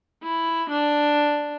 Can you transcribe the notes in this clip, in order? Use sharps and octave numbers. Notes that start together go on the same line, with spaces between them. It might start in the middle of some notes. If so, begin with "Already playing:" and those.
E4
D4